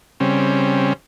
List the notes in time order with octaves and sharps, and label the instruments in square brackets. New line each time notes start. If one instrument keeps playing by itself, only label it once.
[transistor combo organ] C#3 G3 C4 C#4